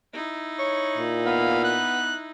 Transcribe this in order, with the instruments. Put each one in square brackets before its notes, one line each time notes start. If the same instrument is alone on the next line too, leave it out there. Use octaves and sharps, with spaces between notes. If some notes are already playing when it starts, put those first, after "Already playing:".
[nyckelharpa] D#4 E4
[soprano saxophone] C#5
[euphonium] A#2
[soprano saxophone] B3 [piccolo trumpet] F5
[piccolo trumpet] F#6